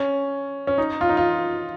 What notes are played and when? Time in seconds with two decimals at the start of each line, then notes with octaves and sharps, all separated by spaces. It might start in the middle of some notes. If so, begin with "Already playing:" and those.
Already playing: C#4
0.67 C#4
0.78 D#4
1.01 F4
1.09 D#4
1.17 F4